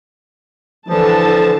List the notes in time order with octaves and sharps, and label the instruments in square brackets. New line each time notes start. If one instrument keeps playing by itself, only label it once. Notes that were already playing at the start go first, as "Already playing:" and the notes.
[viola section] D3 E3 A5 [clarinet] F3